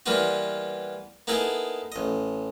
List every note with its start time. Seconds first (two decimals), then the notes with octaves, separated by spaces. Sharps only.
0.06 E3 G3 A#3 B3 F4 F#4
1.27 A#3 B3 D#4 E4 G#4 A4
1.92 A1 D#5